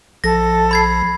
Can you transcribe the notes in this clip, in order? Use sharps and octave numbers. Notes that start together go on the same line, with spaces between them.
A#1 F3 A4 A#6
B5 G#6 C7